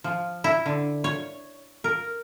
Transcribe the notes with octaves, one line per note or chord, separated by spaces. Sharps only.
F3
E4
D3
C#5
A#4